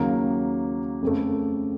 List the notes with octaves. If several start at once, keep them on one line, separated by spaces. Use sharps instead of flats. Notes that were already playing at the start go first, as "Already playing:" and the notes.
Already playing: D#2 C#3 F#3 A#3
F2 C#3 A3